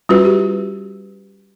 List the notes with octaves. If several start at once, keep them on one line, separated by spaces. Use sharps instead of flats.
G3 C#4 F4 F#4 B4
G4